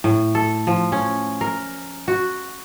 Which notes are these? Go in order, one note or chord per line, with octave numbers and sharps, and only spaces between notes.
A2
A4
F3
C#4
A#4
F#4